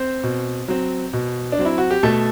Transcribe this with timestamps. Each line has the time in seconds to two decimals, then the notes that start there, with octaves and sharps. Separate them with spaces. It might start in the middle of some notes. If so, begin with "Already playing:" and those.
Already playing: C4 C5
0.23 B2
0.68 F#3 C4
1.13 B2
1.52 D4
1.59 F#3 C4
1.65 E4
1.78 F#4
1.91 G4
2.03 B2 A3 A4